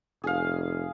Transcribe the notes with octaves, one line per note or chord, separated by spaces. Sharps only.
F1 G#4 F5